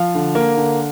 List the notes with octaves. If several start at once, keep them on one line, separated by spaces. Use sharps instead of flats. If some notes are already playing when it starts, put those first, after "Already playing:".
Already playing: F3 F5
D3
A#3
D3